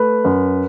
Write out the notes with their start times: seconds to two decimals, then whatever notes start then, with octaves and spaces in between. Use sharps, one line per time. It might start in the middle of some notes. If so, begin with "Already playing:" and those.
Already playing: A3 B4
0.25 F#2